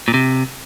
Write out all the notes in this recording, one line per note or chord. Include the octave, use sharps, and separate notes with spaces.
A#2
C3